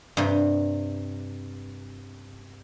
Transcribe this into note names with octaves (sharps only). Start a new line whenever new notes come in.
G2 C3